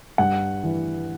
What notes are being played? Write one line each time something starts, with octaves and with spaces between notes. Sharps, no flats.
G2 F#5
E3